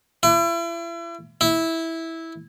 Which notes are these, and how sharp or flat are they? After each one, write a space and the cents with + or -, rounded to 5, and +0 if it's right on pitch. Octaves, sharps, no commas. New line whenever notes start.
E4 +40
E4 -10